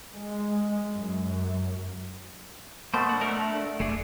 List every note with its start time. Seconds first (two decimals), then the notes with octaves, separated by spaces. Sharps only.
0.14 G#3
0.92 F#2
2.94 B2 A3 A#3 C5
3.09 D4 F#5
3.21 A3 A#4
3.80 F1 A3 G#4 D5